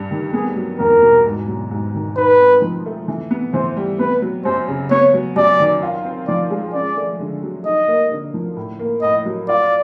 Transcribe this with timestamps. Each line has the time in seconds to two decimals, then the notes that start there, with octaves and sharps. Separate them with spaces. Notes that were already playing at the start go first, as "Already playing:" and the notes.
Already playing: G2 G3
0.11 D#3
0.33 B3 G#4
0.56 F#3
0.79 E2 A#4
1.02 B2
1.26 G#2
1.48 F#3
1.71 G#2
1.94 D#3
2.17 D#4 B4
2.39 C4
2.62 F3
2.86 A3
3.08 E3
3.31 B3
3.54 E3 C5
3.76 G3
3.99 B3 B4
4.22 F#3
4.45 F#2 C5
4.68 C#3
4.91 B3 C#5
5.14 F#3
5.36 F#2 D5
5.60 D#3
5.82 F4
6.05 C4
6.28 F3 D5
6.50 G#3
6.74 C#4 D5
6.97 A3
7.20 D3
7.43 F#3
7.66 D#4 D#5
7.88 A#3
8.12 D3
8.34 F3
8.56 A2
8.79 A#3
9.02 A2 D#5
9.25 F#3
9.48 F4 D5